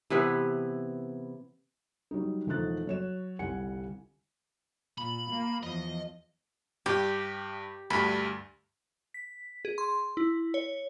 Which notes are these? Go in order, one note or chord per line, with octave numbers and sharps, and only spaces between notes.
C3 E3 B3 B4
F#3 G3 D#4
E1 F3 A3 D#4 F#6 A6
F#3 C#5 E7
G1 C2 G3 F#5 G#5 C#7
A#2 B5
A#3
E2 F3 D#5
G2 G4
D2 G2 B5
B6
G#4
C6
E4
C#5